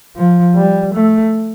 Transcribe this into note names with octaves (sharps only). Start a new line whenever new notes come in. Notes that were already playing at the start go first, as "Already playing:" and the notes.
F3
G3
A3